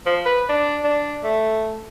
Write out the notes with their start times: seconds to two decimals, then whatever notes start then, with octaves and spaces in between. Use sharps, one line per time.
0.06 F3
0.26 B4
0.49 D4
0.84 D4
1.24 A3